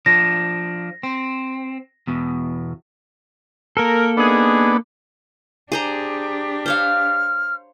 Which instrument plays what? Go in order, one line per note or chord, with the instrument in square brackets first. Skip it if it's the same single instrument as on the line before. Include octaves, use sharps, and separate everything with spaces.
[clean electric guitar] F3 D4 [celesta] A#6
[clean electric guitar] C4
E2 B2
[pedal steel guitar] A#3 A4 [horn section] A#4
[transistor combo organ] B3 D4 [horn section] D#4 G#4
[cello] D4 G4 [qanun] G#4 C5 A#5
[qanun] C5 C#5 F5 [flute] F6